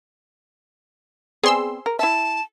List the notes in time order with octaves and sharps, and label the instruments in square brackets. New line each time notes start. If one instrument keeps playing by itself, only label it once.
[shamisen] B3 C4 D5 [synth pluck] G#4 C6 E6
[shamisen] A#4
[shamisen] E4 E5 [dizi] A5